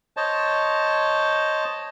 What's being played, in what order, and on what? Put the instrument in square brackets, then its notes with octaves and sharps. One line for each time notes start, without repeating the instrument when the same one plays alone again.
[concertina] C5 C#5 D#5 A5